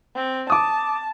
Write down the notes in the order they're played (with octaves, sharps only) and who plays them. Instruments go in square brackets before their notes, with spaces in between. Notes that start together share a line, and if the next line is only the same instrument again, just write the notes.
[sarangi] C4
[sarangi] A5 [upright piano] D6 D#6